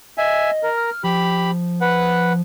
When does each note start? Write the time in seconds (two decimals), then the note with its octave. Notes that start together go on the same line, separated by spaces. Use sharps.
0.18 D#5 E5 G#5
0.63 A#4
0.77 F6
1.04 F3 G4 B5
1.81 B4 F#5